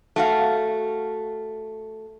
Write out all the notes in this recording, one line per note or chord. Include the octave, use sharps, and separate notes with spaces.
A3 F#4 F5